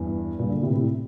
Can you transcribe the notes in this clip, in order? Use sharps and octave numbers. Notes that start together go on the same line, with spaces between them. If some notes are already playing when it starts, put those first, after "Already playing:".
Already playing: E2 G2
G2 A#2
A#2 D3
A2 C3
A2 C3